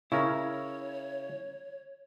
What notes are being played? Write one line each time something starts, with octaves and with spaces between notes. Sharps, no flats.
C#3 C#4 E4 A#4 C#5